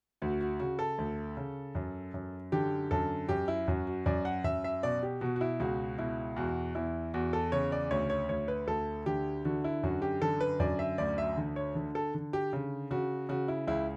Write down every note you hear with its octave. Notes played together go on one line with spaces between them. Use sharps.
D2 F#4
F#4
C#3 F#4
A4
D2
C#3
F#2
F#2
D3 G4
F#2 A4
F#2 G4
E4
F#2 F#4
F#4
F#2 D5
F#5
F#2 E5
E5
B2 D5
G4
B2 F#4
F#4
E4
C#2 F#4
B2 E4
E2 F#4
E2 E4
E2 F#4
A4
C#3 C#5
D5
D2 C#5
C#5
D2 C#5
B4
D2 A4
D3 G4
D3 F#4
E4
F#2 F#4
G4
D3 A4
B4
F#2 D5
E5
D2 D5
E5
D3
C#5
D3
A4
D3
G4
C#3
C#3 F#4
C#3 F#4
E4
C#2 E4